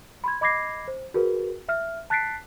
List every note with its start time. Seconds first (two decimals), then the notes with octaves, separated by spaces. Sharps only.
0.24 B5 C6 G#6
0.41 D#5 B5 D6 G#6 A#6 C7
0.88 C5
1.14 F#4 G#4 A#4 B4
1.69 E5 F6
2.10 A5 F#6 A6 B6 C7 D7